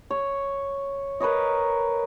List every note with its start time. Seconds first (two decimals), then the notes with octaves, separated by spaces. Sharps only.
0.10 C#5
1.20 A#4 B4 C#5 D#5